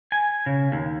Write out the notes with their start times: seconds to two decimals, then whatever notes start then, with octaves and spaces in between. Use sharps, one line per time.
0.12 G#5
0.46 C#3
0.72 D#2